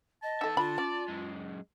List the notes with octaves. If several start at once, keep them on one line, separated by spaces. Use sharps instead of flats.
D#5 A5
B3 D#4 A4 E5
D3 F4 B5
C#4 D5
F#2 G#3